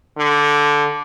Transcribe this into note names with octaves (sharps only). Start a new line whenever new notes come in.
D3